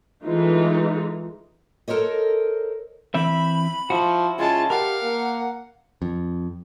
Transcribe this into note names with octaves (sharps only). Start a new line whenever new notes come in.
E3 G#3 A3 D#4 F4
A4 A#4 C5 C#5 D#5
E3 C4 E5 B5
F3 E4 F#4
C#3 G#3 F4 A5
G4 A#4 F5 F#5
A#3
F2